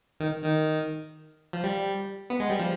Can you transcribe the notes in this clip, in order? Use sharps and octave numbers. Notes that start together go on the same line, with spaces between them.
D#3
D#3
F3
G3
B3
G#3
G3
F3